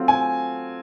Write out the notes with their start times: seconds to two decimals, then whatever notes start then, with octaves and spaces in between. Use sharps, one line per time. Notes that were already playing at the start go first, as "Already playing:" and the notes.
Already playing: F#3 A3 C4 F4
0.08 G#5